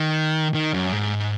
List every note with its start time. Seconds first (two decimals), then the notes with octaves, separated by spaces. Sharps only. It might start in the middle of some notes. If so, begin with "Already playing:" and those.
Already playing: D#3
0.54 D#3
0.74 F#2
0.93 G#2